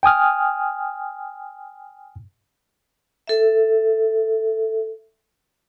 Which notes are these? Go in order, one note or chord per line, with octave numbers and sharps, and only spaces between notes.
G5 G#5 D#6 F6
A4 E5